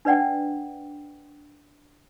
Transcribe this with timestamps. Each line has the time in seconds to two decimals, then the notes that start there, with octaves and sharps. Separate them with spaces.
0.05 D4 B4 D5 F#5 G5